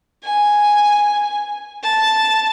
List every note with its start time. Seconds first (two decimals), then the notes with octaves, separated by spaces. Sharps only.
0.24 G#5
1.83 A5